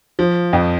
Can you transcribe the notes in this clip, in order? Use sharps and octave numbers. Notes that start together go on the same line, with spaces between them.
F3
F2